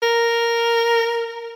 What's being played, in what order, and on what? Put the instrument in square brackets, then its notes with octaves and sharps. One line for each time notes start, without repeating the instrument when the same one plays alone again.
[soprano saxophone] A#4